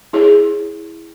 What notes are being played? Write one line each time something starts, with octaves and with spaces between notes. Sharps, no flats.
E4 G#4 C#5